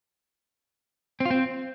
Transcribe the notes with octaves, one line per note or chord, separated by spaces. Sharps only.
C4
F4
C4